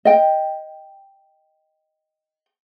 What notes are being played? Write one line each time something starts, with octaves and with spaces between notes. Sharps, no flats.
D#5 G5